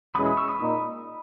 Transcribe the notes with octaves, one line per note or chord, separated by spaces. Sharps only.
E2 B2 G#3 C#4 E4 B5 D#6
B5 D#6
C#6 E6
B5 D#6
A#2 A#3 D#4